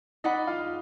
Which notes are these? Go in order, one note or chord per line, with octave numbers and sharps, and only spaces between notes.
D#4 D5 D#5 F#5 B5
F4 F5